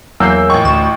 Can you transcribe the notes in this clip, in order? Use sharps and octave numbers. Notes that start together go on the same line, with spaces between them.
E2 F#3 A#3 A#4 G#5 E6 G6 C7
A1 D#5 G5 C#6
D2 E7